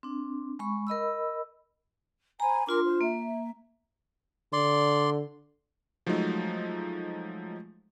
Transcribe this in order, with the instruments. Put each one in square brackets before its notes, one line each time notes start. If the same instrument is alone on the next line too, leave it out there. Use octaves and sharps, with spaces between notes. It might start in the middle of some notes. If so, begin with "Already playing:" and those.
[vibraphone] C4 D4
G#3 B5 C#6
A#4 D#5 B5 E6
[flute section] C5 G#5 [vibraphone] A#5 B5
[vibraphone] D4 F4 C6 [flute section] A#4 D6
[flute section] C5
[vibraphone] A#3 [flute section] E5
[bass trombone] D3 [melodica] D5 C6
[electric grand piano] F3 F#3 G#3 A3 D#4